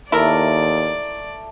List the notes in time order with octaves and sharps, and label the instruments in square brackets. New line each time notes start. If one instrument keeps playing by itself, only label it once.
[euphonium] D#2 [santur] A3 [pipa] E4 A#4 [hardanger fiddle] D5